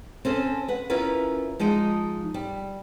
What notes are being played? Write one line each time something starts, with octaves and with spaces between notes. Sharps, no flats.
C4 C#4 A4 C5
B4 F#5
C#4 E4 F4 A#4 B4
F3 G#3 D#4 D#5
G3